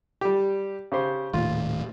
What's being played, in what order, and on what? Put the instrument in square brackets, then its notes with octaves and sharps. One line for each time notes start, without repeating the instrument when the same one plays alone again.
[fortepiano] G3 G4
C#3 G4 C5
[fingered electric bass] D#1 D#2 A2 [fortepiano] F4